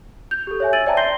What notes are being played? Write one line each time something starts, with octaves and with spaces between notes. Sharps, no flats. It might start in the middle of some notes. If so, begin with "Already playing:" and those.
G6 F7
G4 A4
C#5 E5 G#5
E6 G#6 A6 D7 D#7 F#7
C5 D5 E5 G5 A5 A#5
C6 G6 A#6 C7 G7